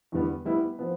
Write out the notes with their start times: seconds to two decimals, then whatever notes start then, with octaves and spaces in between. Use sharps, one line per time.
0.12 E2 D3 G3 B3
0.45 G3 B3 E4
0.79 F3 B3